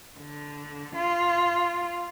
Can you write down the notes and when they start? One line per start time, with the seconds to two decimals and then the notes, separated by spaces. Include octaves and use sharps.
0.19 D3
0.96 F4